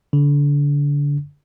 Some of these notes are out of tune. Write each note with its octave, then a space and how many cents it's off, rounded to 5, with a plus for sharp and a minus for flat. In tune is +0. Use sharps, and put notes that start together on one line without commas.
D3 -30